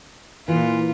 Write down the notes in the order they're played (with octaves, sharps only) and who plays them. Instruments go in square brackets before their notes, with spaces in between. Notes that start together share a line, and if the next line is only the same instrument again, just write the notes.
[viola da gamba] A#2 F4 [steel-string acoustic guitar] E3